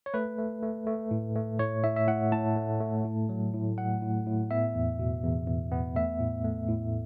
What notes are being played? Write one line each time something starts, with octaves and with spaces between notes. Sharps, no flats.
C#5
A3 B4
A3
A3
A3
A2
A3
A2 C#5
A2 E5
E5
A2 F#5
A2 A5
A3
A3
A2
F#3
A2
F#3 F#5
A2
A2
B3 E5
E2
B2
E2
E2
B3
A3 E5
A2
A3
A2